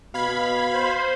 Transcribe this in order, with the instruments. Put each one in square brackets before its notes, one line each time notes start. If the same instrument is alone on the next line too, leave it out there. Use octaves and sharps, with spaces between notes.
[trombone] B2 [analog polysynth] F5 B5 G#6
[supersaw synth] C5